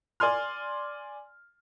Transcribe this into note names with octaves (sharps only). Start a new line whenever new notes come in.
D5 G#5 C6 F6